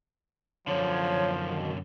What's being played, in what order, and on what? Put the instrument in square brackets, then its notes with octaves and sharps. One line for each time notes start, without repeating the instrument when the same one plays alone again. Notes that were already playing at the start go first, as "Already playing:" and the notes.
[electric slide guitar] F#2 D3 [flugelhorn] F3 [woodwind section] C#5
[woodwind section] B2 D#3